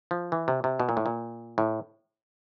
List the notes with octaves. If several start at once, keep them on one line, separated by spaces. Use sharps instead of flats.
F3
E3
C3
C3
B2
A#2
A2
A#2
A2